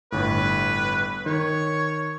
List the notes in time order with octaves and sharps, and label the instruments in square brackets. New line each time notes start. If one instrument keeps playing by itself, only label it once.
[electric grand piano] G1 A2 [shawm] B4
[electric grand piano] D#3 [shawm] C#5